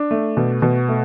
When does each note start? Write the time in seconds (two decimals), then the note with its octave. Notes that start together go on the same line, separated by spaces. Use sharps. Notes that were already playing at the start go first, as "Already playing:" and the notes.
Already playing: D4
0.11 A3
0.37 B2
0.62 B2
0.88 A3